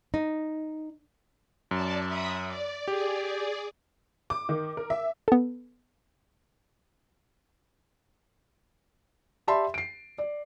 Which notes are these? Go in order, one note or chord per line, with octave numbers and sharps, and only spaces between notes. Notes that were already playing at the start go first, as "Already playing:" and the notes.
D#4
F#2 D5 A5
E5 B5 D#6
D5
G4 G#4 D5
D6
D#3
A#4
E5
B3 A4
G4 D5 E5 A5 B5 C6
C7 D7
D5